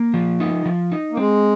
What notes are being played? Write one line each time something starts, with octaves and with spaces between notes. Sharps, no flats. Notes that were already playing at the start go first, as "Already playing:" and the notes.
Already playing: A#3
F3
D#4
F3
D#4
A#3
G#3 C4